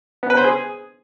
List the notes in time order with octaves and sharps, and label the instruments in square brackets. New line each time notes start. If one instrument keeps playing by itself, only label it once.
[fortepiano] B3
B4
C5
G#4